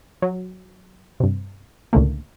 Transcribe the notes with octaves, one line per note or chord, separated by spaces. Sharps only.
F#3
G2 C3
C#2 A2 D3 A3 A#3